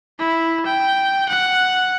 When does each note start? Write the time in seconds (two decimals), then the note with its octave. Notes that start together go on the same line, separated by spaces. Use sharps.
0.19 E4
0.66 G5
1.29 F#5